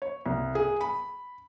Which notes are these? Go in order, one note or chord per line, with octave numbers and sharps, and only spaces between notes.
C#5
C2
G#4
B5